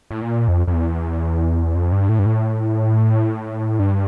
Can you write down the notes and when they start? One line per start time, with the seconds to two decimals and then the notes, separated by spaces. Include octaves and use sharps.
0.11 A2
0.22 A#2
0.48 F2
0.67 F2
0.73 E2
1.75 F2
1.92 G2
2.09 A2
2.19 G2
2.26 A2
3.79 G2